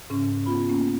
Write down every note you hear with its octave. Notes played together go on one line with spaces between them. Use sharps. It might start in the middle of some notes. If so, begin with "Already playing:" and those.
G#2 C#3 C#4
B3 F4 B5
A#3 C#4